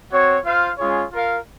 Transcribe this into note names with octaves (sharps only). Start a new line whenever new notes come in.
C4 F#4 C#5
F4 C5 F5
G#3 C#4 F4 G#4 C#5
F4 A#4 F5